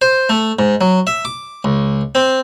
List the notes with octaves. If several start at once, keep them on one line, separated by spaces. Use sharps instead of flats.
C5
A3
G#2
F#3
E5
D6
C#2
C4